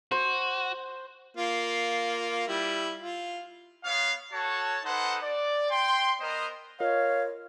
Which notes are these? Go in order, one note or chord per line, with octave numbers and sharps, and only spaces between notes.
F#4 C5
A#3 F4
G3 E4
F4
B3 C#5 F5
F#4 A4 C#5 A5
D#4 A4 B4 C5 F#5
D5
G5 C6
B3 A#4 C5 D#5
F4 A#4 C#5 D#5 F5